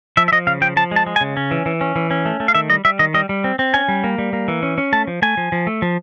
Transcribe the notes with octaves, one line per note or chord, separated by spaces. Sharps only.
F3 E5
E5
F3 D#5
C#3 F5
F3 G5
F3 A5
G#3 A5
G#3
G#5
C#3
C#4
E3
E3
C#4
E3
C#4
A3
A3
F5
D#3 E5
G3 D#5
G3 E5
D#3 D#5
G3 D#5
G3
C4
C4
C#4 G#5
G3
A#3
G3
A#3
E3
C#4
C#4
A3 A5
F3
A3 G#5
F3
F3
A3
F3